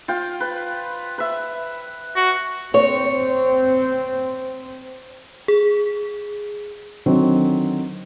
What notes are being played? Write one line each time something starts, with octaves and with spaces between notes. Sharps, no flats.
F4 G5
B4
B4 E5
F#4
C4 C#5
G#4
D3 D#3 F#3 C4